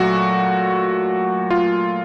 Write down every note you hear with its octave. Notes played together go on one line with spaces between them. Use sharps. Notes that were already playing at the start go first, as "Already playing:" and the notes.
Already playing: A#2 F#3 A3 F#4
F4